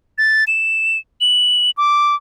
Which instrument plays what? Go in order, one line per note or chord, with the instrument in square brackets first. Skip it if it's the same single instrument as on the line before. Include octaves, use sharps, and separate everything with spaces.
[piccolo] A6
E7
F#7
D6